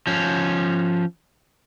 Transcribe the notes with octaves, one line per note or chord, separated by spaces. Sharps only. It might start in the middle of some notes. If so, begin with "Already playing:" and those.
F3 C#4